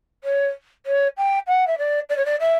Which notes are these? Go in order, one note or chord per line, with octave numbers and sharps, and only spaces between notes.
C#5
C#5
G5
F#5
E5
D5
D5
C#5
D5
E5